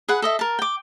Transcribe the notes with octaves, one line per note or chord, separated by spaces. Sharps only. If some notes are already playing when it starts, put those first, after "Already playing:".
G#4 B4 F#5
A4 D#5 E5
A#4 A5
G5 D6